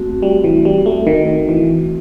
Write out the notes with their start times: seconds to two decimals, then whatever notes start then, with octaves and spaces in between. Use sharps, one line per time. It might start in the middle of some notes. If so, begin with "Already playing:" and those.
Already playing: A3 C4 F#4
0.23 G3
0.44 E3
0.65 G3
0.86 A3
1.07 D#3
1.49 E3